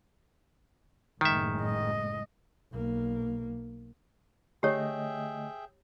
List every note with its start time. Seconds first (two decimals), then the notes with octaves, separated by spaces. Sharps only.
1.21 F#1 A2 D#3 G#3 E5
1.63 D#5
2.72 B1 A#3
4.63 D3 A3 G4 G#4 C#5 D#5 E5 G5